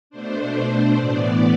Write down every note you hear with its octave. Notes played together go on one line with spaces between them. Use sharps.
B2 A3 D4 C5
A2 E3 B3 D5